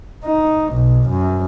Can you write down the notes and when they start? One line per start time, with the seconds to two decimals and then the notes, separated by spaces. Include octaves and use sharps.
0.25 D#4
0.73 B1
1.09 F#2